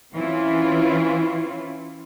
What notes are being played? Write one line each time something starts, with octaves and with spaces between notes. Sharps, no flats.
E3 C4 C#4 E4 F4